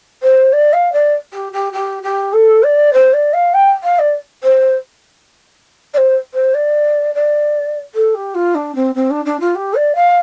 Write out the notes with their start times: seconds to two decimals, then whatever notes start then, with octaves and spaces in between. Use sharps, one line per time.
0.22 C5
0.53 D5
0.73 F5
0.93 D5
1.33 G4
1.52 G4
1.73 G4
2.03 G4
2.33 A4
2.63 D5
2.93 C5
3.13 D5
3.33 F5
3.54 G5
3.83 F5
3.99 D5
4.43 C5
5.94 D5
5.97 C5
6.33 C5
6.54 D5
7.15 D5
7.94 A4
8.14 G4
8.34 F4
8.55 D4
8.75 C4
8.95 C4
9.10 D4
9.25 D4
9.40 F4
9.55 G4
9.75 D5
9.95 F5